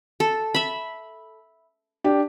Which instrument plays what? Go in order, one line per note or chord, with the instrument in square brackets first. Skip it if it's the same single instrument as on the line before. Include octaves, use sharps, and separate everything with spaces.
[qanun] A4
E5 B5
[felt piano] D4 G4